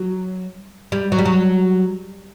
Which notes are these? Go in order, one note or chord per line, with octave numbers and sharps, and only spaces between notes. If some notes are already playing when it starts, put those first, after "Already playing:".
Already playing: F#3
G3
F#3
G3
F#3